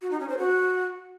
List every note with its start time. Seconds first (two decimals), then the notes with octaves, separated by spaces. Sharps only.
0.02 F#4
0.11 D#4
0.20 C#4
0.29 C5
0.38 F#4